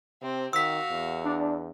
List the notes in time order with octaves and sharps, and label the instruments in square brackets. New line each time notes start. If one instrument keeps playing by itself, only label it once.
[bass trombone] C3 [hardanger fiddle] C4
[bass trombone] D#3 [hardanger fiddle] F#4 F5 [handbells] E6 B6
[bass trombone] E2
[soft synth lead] D4